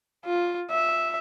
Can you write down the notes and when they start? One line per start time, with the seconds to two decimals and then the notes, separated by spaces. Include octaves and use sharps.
0.25 F4
0.70 E5